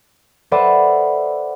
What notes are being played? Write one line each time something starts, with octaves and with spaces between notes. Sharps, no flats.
A4 B4 C5 D5 E5 F#5